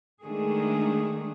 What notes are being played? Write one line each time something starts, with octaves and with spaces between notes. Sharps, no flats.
D#3 G#3 A3 D4 G#4